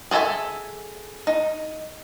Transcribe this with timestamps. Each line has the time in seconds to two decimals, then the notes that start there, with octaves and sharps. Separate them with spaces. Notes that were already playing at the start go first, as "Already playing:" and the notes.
0.11 G#4 A4 C#5 E5 G#5
1.27 D#4